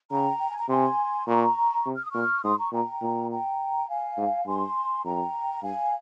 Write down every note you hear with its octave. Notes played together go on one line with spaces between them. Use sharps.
C#3 G5 A#5
G5
G#5
A#5
C3 G#5 C6
A#2 A#5 C#6
C3
F6
D#6
A#2 C#6 F6
G#2 C6 D#6
A#5 C#6
A#2 G5 A#5
A#2
G5 A#5
F5 G#5
G#2
G2 G#5 C6
F2 G5 A#5
G2 F5 G#5